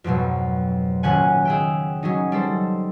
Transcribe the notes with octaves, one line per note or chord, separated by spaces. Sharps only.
F2 G#2 B2 F#3
D#1 C#3 C#4 F#5 G#5
G#4 E5 G5
F#3 C#4 D#4
G3 A4 C5